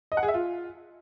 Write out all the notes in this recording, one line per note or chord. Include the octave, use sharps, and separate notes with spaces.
D#5
F#5
G#4
E5
F4